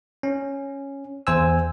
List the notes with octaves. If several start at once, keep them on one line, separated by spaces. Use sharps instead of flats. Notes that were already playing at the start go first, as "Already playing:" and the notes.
C#4
E2 C5 G#5 E6